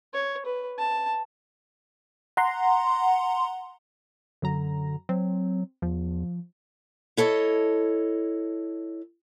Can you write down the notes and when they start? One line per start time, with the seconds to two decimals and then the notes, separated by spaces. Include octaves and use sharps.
0.14 C#5
0.46 B4
0.79 A5
2.37 F#5 A#5 C6
4.42 F#2 D3 F#3 A#5
5.09 F#3 C4
5.82 E2 F3
7.17 E4 A4 C#5 D#5